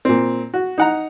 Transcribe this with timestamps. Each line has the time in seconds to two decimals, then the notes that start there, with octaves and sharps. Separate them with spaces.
0.05 A#2 C4
0.54 F#4
0.78 D#4 F#5 A#5